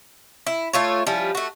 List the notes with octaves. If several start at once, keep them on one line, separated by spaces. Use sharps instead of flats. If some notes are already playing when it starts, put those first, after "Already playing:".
E4
A3 F4 C#5
F3 G3 C#4 E4
A3 F#4